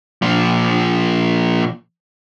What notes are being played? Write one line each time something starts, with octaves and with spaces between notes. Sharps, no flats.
A#2 F3